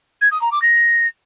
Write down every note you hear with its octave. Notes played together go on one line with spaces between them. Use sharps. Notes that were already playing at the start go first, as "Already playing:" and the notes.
G#6
D#6
A#5
D6
A#6